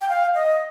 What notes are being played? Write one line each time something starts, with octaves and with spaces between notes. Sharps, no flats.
G5
F5
D#5